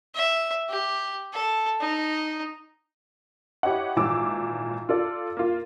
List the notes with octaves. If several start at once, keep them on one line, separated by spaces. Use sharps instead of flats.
E5
G4
A4
D#4
E4 G4 C#5 D#5 F#5
G#1 A#2 E3 D6 E6
F4 A4 D5
A#3 F4